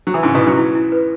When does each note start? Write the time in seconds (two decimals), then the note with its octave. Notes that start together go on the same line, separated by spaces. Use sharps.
0.07 F#3
0.14 E3
0.23 G#2 C#3 E4
0.35 B2
0.40 E4
0.46 C#3 F#3
0.57 E4
0.75 E4
0.92 B4